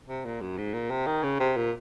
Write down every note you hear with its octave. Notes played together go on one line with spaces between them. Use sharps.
C3
A#2
F#2
G#2
A#2
C3
D#3
C#3
C3
A#2